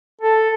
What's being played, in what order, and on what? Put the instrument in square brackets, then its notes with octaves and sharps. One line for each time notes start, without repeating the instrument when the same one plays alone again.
[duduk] A4